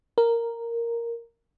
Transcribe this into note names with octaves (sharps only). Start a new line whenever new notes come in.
A#4